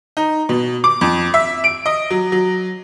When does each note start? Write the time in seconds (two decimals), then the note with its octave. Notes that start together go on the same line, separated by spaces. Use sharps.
0.17 D#4
0.49 B2
0.84 D6
1.01 F2
1.34 E5
1.64 D7
1.86 D#5
2.10 F#3
2.32 F#3